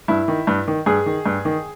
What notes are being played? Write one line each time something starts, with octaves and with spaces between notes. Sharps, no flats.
G2 E4
D#3
G2
D#3
G2 G#4
D#3
G2
D#3